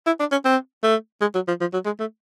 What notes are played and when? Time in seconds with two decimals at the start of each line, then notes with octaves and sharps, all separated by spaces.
0.06 E4
0.20 D4
0.31 C#4
0.45 C4
0.83 A3
1.21 G#3
1.35 F#3
1.48 F3
1.61 F3
1.73 F#3
1.86 G#3
1.99 A3